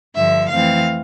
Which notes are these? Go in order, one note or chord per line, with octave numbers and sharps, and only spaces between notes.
G2 D3 F3 E5
F2 E3 A3 C4 F5